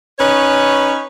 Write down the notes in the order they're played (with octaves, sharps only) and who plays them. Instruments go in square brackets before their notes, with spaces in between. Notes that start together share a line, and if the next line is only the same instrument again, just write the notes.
[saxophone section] C#4 D#4 B4 C#5